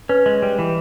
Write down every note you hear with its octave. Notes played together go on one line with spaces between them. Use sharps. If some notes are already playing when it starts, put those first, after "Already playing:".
C#4 B4
G#3
G3
E3